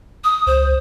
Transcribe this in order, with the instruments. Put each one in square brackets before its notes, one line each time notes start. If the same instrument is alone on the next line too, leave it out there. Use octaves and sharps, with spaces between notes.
[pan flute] D#6
[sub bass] C#2 [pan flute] C5